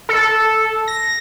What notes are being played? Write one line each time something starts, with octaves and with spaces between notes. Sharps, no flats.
A4
A#6